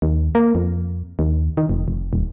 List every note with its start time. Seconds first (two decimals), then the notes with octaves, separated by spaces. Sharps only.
0.02 D#2
0.35 A#3
0.55 F2
1.19 D#2
1.57 D#3
1.69 F1
1.88 F1
2.13 D#1